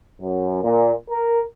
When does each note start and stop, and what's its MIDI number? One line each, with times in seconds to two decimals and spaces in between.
0.21 0.63 42
0.64 0.92 46
1.10 1.39 70